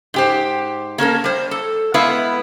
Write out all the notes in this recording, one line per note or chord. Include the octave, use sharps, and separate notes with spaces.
G#2 G4 C5
A#3 C#4 A4 A#4
G3 C5
A4
G#3 B3 E4 B4 F5